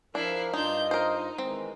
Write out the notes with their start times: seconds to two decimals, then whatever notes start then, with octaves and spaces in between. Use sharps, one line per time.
0.15 F3 D4 E4 A#4 C7
0.53 G2 D4 D#4 F4 D#5 G6
0.91 D#4 A#4 C5
1.38 D#3 E3 G#3 C4